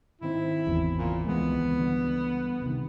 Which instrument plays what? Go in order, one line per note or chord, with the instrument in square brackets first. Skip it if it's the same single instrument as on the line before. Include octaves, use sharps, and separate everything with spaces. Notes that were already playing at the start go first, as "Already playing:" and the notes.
[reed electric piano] G#2 D#3 C4 [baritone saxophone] E4
[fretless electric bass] G#1 E2 C#3
[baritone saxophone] A#2
[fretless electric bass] C#2 E3 G#3 [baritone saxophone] B3
[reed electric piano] D3 G3
[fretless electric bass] C3 D#3